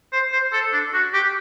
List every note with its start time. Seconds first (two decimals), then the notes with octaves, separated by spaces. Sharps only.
0.13 C5
0.32 C5
0.53 A4
0.73 D4
0.93 F#4
1.14 G4